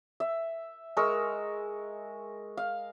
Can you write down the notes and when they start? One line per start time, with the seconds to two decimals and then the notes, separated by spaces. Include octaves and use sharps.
0.20 E5
0.97 G#3 A#4 C#6 E6
2.57 F5